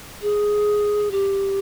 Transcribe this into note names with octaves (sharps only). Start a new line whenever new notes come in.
G#4
G4